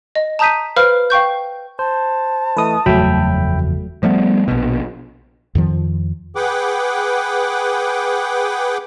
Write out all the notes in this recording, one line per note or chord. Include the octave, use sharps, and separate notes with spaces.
D#5
A5 A#5 D#6 G6 B6 D#7
B4 C5 F5 B5 F6
F5 G5 C#6 G6
C5 A5
E3 A3 B4 D#5 D#6
F#1 E2 F3 F#3 A3 E5 G5 B5
F3 G3 A3 B3
A#1 B2
F2 D#3 F3
G#4 B4 F#5 G5 D6